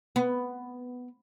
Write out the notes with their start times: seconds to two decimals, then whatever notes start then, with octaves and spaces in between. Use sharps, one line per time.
0.16 B3